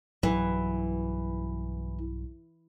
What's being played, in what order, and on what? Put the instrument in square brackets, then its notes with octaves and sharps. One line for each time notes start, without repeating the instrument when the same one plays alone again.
[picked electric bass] B1 G2 F#3 [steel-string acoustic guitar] E3